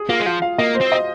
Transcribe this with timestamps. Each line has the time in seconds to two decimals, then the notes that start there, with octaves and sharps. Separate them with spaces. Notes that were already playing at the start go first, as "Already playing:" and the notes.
Already playing: G#4
0.09 A#3 F4
0.20 G#3
0.26 F3 F4
0.42 F5
0.58 A#3 D#5
0.75 C5
0.81 C4
0.92 D#5